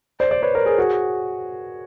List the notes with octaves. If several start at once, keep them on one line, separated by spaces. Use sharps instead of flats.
C5 D5
C5 D5
B4 C#5
A#4 C5
G#4 A#4
F#4 G#4